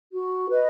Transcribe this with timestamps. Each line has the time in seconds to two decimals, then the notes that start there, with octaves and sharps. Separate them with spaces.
0.10 F#4
0.50 B4 D#5